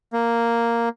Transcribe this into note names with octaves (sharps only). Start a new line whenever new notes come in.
A#3